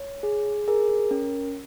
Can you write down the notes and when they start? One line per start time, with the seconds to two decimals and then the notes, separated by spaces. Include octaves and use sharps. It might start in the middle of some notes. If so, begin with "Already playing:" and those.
Already playing: C#5
0.23 G#4
0.68 G#4 A#4
1.11 C#4